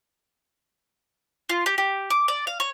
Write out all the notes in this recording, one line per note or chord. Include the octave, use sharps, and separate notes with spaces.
F4
G4
G4
D6
D5
F5
C#5